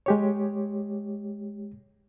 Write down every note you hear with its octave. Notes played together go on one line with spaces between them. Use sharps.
G#3 G4 C#5